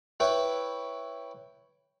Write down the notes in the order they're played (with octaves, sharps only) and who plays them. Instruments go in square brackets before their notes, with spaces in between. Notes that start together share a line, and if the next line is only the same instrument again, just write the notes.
[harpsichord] E4 B4 C#5 G5